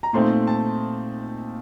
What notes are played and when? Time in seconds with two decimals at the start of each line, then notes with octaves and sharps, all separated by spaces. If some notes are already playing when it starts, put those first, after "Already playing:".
0.03 A#5
0.13 A#2 A3 C4 D#4 C6
0.47 A5